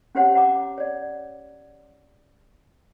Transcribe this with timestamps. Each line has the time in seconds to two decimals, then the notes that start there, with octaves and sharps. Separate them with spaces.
0.15 C#4 F#4 G4 C5 C#5 F#5
0.35 F#5 A#5 D6
0.78 C#5 D5